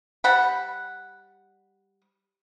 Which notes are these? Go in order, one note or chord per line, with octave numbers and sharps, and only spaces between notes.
G3 F#5 B5